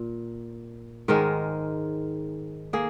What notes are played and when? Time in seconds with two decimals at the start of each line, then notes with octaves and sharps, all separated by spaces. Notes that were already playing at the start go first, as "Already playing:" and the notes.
Already playing: A#2
1.08 G#2 D#3 G#3 A#4
2.73 A#3 G#4